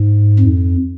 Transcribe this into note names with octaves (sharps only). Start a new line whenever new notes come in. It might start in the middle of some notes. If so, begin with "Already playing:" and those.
Already playing: G#2
F2